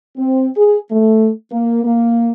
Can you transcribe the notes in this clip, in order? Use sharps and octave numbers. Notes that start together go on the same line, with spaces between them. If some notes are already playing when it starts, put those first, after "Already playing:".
C4
G#4
A3
A#3
A#3